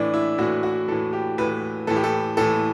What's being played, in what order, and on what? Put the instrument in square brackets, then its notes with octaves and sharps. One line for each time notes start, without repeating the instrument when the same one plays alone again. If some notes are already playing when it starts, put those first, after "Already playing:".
Already playing: [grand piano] A2 E3 D4
E4
A2 E3 F#4
F#4
A2 E3 A4
G4
A2 E3 B4
A2 E3 A4
G4
A4
A2 E3 A4